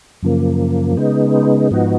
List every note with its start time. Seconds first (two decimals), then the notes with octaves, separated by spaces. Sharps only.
0.23 F#2 C#3 F3 A#3
0.97 C#3 G#3 B3 D#4
1.71 G#2 F3 B3 D#4 F#4